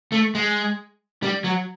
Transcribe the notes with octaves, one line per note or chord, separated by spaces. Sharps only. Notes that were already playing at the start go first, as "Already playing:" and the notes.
A3
G#3
G3
F#3